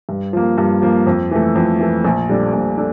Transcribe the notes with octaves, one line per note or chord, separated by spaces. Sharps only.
G2
F3 A#3
G2
F3 A#3
F2
E3 A3
F2
E3 A3
A#1
A#2 G3 D4 A4
A#1
D4 A4